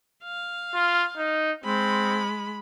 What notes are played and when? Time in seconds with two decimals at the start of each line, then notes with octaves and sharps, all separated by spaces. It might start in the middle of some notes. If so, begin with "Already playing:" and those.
0.24 F5
0.74 F4
1.17 D#4
1.64 G#3 C4 B5